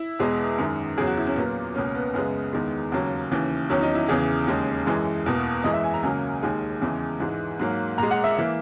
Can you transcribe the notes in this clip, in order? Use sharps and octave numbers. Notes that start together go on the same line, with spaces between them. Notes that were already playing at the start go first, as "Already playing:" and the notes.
Already playing: E4
E2 B2 G#3
F#2 D#3 G#3
E2 C#3 F#3 G#4
F#4
E4
C#4
A#2 F#3 A#3 B3
C#2 B2 A#3 C#4
B3
F#2 C#3 G#3 B3
E2 D#3 G#3
D#2 C#3 F#3 A#3
D#2 C#3 E3
E2 D#3 F#3 C#4
D#4
E4
E2 C#3 E3 G#4
D#2 C#3 G#3
F#2 E3 G#3
E2 B2 A#3
F#2 E3 G#3 D#5
E5
G#5
A#5
C#2 C#3 F#3 A#3 G#5
D#2 D#3 G#3 G#5
E2 C#3 E3 G#3
G#2 E3 G#3
G#2 F#3 A#3
A#2 G#3 A#5
F#5
E5
E3 A#3 E5